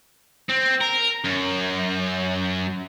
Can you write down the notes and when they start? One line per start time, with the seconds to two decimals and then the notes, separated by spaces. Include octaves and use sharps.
0.50 C4
0.81 A#4
1.24 F#2